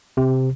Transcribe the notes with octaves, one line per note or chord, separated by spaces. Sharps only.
C3